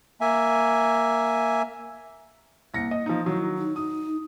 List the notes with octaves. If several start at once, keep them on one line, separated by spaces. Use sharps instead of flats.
A#3 E5 G#5
C2 A#3 A#6 C#7
D#5
F3 D#4
D#3 F#3 E4
D#4
D#4 D#6